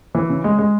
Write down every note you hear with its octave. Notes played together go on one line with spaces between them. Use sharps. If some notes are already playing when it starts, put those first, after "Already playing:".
E3
C#3
G#3
G#3